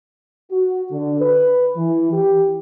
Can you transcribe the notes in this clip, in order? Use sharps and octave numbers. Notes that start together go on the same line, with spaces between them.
F#4
D3
B4
E3
G4